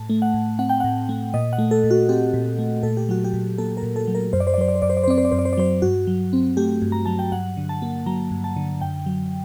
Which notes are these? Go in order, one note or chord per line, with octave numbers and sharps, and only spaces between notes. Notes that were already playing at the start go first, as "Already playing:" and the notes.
Already playing: A2 A5
A3
F#5
A2
C4 F#5
G5
A2 F#5
A3
A#2 D#5
F#5
A3
A4
A#2
F#4
C4 G4
A#2
A3
A#2 A4
G4
F#3 F#4
G4
A#2
A#3 A4
A#4
A#2
A4
F#3
A#4
F#2 C5
D5
C5
D5
F#3 C5
D5
C5
F#2 D5
C5
D5
C5
C4 D5
C5
D5
F#2 C5
D5
C5
D5
F#3 C5
G2 F#4
F#3
C4
A3 G4
G2
A#5
F#3 A5
G5
G2 F#5
D3
A5
A#3
F#3 A#5
G2
A5
D3
F#2 G5
F#3